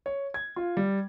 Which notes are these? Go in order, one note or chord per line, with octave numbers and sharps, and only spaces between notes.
C#5
G#6
F4
G3